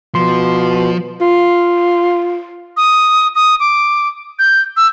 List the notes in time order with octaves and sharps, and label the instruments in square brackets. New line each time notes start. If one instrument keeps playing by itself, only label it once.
[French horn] B2 [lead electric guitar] F3 [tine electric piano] C6
[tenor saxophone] F4
[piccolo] D#6
D#6
D6
G6
E6